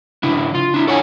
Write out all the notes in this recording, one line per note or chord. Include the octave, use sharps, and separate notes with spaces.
C#3 D4 E4
F4
D4 E4
A4 C#5 F#5 G#5